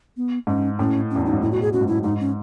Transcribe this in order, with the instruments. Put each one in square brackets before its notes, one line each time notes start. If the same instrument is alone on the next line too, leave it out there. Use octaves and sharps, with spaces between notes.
[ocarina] B3
[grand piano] G#2 [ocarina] C#4
[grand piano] A2 [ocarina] C#4
[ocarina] C#4
[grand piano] E2
[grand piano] F#2 [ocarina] D#4
[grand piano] G#2
[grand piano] A2 [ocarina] E4
[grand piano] B2 [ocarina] F#4
[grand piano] A2 [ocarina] G#4
[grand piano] F#2 [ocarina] F#4
[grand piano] G#2
[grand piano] F#2 [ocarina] E4
[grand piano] G#2 [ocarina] D#4
[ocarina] C#4